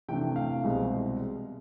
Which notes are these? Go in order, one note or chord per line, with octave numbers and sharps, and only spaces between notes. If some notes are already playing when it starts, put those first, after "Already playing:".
C3 E3 A3 D4 G5
F5
C2 B2 G#3 C4